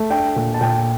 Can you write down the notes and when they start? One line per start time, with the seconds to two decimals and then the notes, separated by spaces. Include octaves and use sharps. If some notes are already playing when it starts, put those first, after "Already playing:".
Already playing: A3
0.10 D4 G5
0.36 A#2
0.54 A5
0.61 A#2 G5